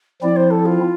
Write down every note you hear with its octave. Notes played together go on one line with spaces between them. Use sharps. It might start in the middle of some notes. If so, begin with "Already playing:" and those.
F3 C4 E4 D5
C5
A4
F4